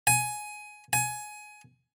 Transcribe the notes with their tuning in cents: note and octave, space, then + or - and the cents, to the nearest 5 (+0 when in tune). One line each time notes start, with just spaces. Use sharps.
G#5 +15
G#5 +20